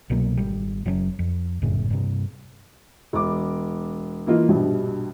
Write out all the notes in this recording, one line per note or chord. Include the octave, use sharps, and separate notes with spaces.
C2 B2 F#3 A#3
G#1 G3
F#1 F#3 C4 C#4
F2
G1 F#2 A2 C#3
G2 C3
E1 D6
E3 A#3 D#4 F4
A#1 G2 B2 G3